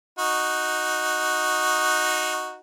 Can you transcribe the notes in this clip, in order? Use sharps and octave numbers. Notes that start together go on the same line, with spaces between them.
D#4 F#4